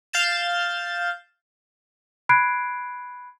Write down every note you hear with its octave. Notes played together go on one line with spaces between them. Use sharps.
F5 G6 A6 E7
B5 F#6 G#6 C7 D7